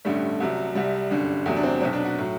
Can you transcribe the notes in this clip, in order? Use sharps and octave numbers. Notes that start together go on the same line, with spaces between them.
A1 G2 D3 G3 A3
C2 C3 F#3
C2 C3 G3
G1 F#2 D3 G3
E2 C3 F#3 A3
D4
C4
B1 B2 F#3 C4
D4
F#4
A2 F#3